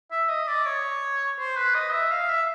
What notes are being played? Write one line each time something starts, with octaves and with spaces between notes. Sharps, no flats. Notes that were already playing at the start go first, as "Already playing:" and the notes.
E5
D#5
D5
C#5
C5
B4
D#5
E5
F5
E5